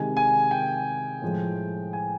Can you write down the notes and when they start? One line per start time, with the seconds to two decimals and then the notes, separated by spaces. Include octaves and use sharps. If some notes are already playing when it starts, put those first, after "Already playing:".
Already playing: C3 D#3 G#3 G#5
0.17 G#5
0.51 G5
1.22 A2 F3 G#3
1.93 G#5